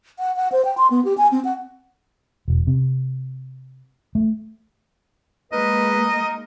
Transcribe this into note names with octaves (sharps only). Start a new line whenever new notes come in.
F#5
F#5
C5
G5
C6
B3
G4
G#5
C4
F#5
E1
C3
A3
G#3 A#3 D#4 A#4 B4 D#5